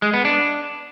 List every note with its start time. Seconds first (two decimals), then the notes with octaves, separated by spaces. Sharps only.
0.02 G#3
0.14 B3
0.25 D4